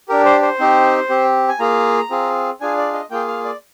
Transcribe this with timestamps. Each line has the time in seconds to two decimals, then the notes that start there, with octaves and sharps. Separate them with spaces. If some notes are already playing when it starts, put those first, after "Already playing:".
0.09 D4 G4 A#4
0.25 C5
0.42 C5
0.60 C4 D#4 G4
1.10 C4 G4
1.49 G#5
1.59 A#3 F4 G#4 A#5
2.10 C4 F4 G#4
2.61 D4 F4 G#4 G#5
2.77 D5
2.93 D#5
3.11 A#3 F4 G#4 G5
3.28 F5
3.45 D5